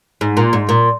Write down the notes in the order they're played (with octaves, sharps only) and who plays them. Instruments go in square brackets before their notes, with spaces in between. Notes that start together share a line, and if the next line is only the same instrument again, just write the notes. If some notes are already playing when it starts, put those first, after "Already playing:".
[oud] G#2
A#2
G#2
A#2